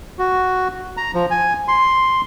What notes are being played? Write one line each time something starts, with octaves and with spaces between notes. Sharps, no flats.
F#4
A#5
F3
G#5
C6